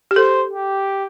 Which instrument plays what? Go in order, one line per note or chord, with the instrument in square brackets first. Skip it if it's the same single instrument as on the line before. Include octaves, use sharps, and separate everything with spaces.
[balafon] G4
[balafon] A4 [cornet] C5
[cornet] G4